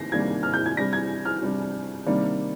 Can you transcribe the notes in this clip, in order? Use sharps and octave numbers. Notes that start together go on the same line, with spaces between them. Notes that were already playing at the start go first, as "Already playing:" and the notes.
Already playing: C3 D#3 A#3 A#6 C7
C3 D#3 G3 A#3 D4 G#6
F6
G6
G#6
C3 G3 D4 A#6
G#6
F6
C3 G3 D4
C3 D#3 G3 A#3 D4